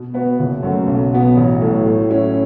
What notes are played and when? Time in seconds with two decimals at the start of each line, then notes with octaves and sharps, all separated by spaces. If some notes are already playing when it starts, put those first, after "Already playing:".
Already playing: B2
0.14 B3 F#4 B4
0.40 F#1
0.63 F#2 F#3 A3 F#4
0.88 B1
1.12 B2 B3 F#4
1.37 A1
1.61 A2 F#3 A3
1.86 A2
2.10 F#3 C#4 E4